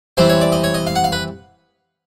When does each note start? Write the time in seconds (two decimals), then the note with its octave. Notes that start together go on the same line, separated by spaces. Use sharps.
0.17 E3 G3 C4 C5
0.29 C#5
0.41 D5
0.52 D#5
0.64 C#5
0.74 D#5
0.87 F5
0.96 F#5
1.04 F5
1.12 B4